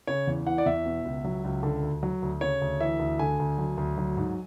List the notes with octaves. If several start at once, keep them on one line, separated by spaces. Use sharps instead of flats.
C#3 C#5
E2
E3 F#5
D5
E2 E5
B2
C#2
F#3
C#2
D3
D2
F#3
D2
C#3 C#5
D2
E3 E5
D2
D3 G#5
D2
F#3
D2
F#3
G#2